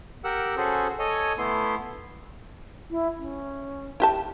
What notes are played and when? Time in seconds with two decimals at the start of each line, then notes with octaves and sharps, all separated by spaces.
0.24 G4 A#4 F#5 E6
0.57 C#4 F#4 G#4 A4 C5
0.99 A4 C#5 D#5 G#5
1.38 A3 B3 E4 C6
2.90 E4
3.18 C#4
4.00 E4 G4 A5